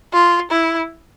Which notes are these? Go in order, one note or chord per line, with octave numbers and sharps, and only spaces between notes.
F4
E4